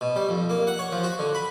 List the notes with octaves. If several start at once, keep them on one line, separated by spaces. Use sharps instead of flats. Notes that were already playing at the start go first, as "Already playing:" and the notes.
B2
G3
F2
A#3
F#5
C#5
F3
F#4
D3
B5